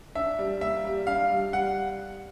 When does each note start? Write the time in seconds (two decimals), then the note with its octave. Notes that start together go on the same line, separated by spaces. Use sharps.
0.15 D4 E5
0.39 G3
0.61 A#3 E5
0.84 G3
1.07 D4 F5
1.30 G3
1.53 G3 F#5